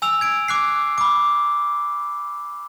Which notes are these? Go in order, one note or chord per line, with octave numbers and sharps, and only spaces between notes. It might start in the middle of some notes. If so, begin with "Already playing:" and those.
G#5 E6 F7
G#6 D7
D6 F#6 C7
B5 D6